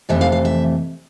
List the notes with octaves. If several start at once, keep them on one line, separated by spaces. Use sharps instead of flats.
F2 C3 E3 A3 E5
F5
F5
E5